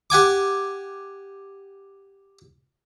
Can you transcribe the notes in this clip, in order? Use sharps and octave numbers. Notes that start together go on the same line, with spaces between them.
G4 F#5 G#5 D6